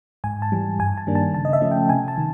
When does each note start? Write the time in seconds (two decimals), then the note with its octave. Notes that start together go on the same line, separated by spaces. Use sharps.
0.24 G#2 G#5
0.42 A5
0.52 E3 G3
0.79 G2 G#5
0.98 A5
1.07 D#3 G3 A#3 D4
1.15 A5
1.34 C#3 A5
1.45 D#5
1.53 E5
1.62 F3 A3 C#4
1.71 G5
1.89 C3 G#5
2.08 A5
2.18 D#3